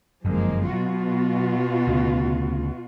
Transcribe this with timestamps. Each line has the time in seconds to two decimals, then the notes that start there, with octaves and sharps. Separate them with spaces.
0.25 G1 F#2 F3 G#3 A#3
0.73 B2 F#3 F4 F#4
1.88 D2 C#3